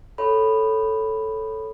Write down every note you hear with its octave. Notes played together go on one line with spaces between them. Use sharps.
A4 C#5 B5